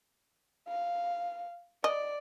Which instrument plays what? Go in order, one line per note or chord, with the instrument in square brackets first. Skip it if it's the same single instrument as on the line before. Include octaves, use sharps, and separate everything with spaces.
[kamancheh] F5
[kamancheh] D5 [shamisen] D#5